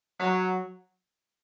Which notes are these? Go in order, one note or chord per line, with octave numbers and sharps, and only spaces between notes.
F#3